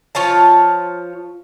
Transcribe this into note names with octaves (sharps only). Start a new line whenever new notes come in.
F3 F4 C#5 A5